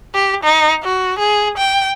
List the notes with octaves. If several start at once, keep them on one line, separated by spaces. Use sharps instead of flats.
G4
D#4
F#4
G#4
G5